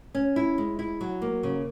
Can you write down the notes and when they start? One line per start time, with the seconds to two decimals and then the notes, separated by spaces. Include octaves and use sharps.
0.15 C#4
0.36 E4
0.58 G#3
0.79 E4
1.01 F#3
1.22 A#3
1.43 C#3